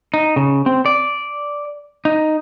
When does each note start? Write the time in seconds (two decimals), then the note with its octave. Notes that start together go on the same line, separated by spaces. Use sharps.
0.14 D#4
0.36 C#3
0.66 C4
0.86 D5
2.05 D#4